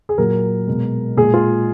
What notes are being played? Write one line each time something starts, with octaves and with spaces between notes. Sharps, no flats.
G#4
A#2 F#3 A#4
B2 G#3
A#2 G#3 G#4
F4